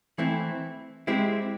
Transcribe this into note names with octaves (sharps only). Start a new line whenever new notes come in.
E3 A3 C4 E4
G#3 C4 E4 G4